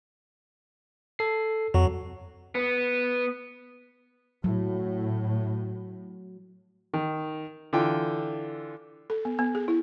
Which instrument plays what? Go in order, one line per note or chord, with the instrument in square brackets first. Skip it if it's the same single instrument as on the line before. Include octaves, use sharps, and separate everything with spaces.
[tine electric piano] A4 C7
[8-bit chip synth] F2 [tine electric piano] F#3 F#4
[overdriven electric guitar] B3
[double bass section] A2 [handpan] F#3
[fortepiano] D#3
D3 E3 F4 G5
[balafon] A4
B3
B3
G#4
E4